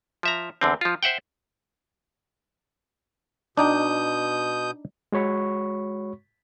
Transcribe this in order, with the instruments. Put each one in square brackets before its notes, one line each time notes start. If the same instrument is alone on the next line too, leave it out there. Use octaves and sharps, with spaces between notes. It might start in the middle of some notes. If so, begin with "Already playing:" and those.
[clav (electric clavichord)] F3 E5 A#5
E2 D3 C4
F3 F4
C5 E5 F#5 G5
[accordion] B2 D#6 G6 [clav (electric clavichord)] D4 D#4 G5
[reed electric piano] G#3 F#4 C#5 B5 C#6